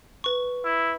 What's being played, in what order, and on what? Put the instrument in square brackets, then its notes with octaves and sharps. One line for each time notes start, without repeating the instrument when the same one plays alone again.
[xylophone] B4 C#6
[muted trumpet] E4